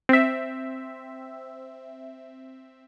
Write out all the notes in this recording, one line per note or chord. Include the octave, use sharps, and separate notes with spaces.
C4 E5